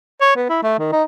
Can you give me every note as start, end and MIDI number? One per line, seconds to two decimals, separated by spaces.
0.21 0.35 73
0.36 0.49 59
0.49 0.59 64
0.63 0.74 57
0.79 0.88 51
0.92 1.03 63